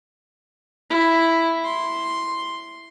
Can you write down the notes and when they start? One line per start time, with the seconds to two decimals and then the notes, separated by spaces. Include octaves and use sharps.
0.90 E4
1.64 C6